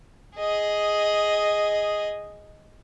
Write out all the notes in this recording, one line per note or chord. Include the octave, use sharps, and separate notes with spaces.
G#4 D#5